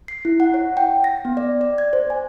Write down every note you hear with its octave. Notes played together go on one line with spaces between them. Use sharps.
C7
E4
F#5
C#5
G5
A#6
B3
D5
D5
G#6
C5
G#5